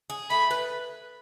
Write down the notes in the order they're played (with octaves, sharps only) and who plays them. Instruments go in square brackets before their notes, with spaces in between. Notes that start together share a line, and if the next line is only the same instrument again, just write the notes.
[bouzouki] G#4
[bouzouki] A3 [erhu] B5
[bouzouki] B4